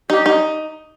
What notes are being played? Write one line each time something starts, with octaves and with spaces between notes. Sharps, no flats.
D#4 G4
D#4